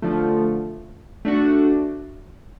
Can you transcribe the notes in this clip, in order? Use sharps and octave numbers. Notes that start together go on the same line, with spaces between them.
D3 F3 A3
A3 D4 F#4